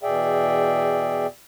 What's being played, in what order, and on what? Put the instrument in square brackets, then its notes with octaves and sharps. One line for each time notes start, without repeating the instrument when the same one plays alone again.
[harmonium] E2 B2 G#4 D5 E5 G5